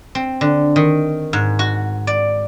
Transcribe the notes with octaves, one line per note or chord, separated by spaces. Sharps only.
C4
D3
D#3
G#2
F#4
D5